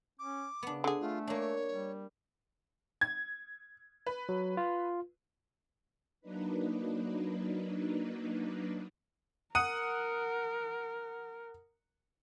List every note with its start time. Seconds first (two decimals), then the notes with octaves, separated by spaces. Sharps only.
0.19 C#4 D6
0.63 C#3 B3 D4
0.84 D3 G#4
1.00 A3 F4
1.27 A#3 D4 C#5
1.71 G3
3.01 G#6
4.07 B4
4.29 F#3
4.57 F4
6.21 F#3 A#3 D4 D#4 B4
9.55 A#4 F#5 D#6 D#7